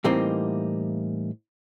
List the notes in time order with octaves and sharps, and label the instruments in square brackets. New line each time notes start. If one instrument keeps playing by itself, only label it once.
[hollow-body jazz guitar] A2 E3 G3 A#3 C4 D#4